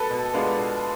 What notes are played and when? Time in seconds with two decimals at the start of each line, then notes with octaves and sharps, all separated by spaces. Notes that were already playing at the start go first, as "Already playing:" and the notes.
Already playing: A4 B4
0.10 B2
0.33 G#3 B3 D4 F4
0.58 B2